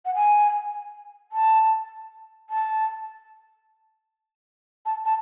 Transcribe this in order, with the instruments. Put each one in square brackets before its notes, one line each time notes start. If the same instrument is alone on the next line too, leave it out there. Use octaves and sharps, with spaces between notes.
[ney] F#5
G#5
A5
A5
A5
A5